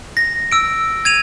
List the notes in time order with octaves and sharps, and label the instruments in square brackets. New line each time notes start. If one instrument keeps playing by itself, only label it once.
[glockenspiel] A#6
E6 D7
G#6 D#7 F7